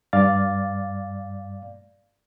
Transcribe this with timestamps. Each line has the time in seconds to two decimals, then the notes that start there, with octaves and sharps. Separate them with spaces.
0.13 G2 D5 F5 A6